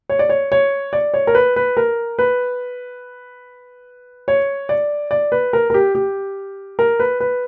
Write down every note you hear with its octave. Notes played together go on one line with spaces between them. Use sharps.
C#5
D5
C#5
C#5
D5
C#5
A#4
B4
B4
A#4
B4
C#5
D5
D5
B4
A#4
A#4
G4
G4
A#4
B4
B4